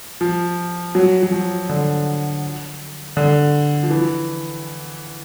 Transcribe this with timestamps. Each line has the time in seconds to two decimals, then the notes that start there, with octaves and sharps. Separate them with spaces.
0.21 F3
0.95 F#3
1.23 F#3
1.32 F3
1.69 D3
3.17 D3
3.83 F3
3.91 E3